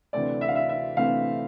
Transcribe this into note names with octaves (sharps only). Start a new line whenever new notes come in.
D2 C3 E3 A3 C4 D5
E5
F5
E5
E5
D2 C3 E3 A3 C4 F5